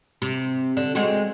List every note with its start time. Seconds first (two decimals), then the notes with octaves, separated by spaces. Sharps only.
0.22 C3
0.77 D3
0.95 G#3 C4 F#4